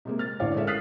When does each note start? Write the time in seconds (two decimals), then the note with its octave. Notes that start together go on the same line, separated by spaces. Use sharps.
0.05 C3 G#3 A#3
0.19 F6 A6
0.40 A1 D3 E3 C#5 D5 F5
0.54 G#3 A4 A#4 C#5 E5
0.67 D#6 F6 F#6 A6 B6 C7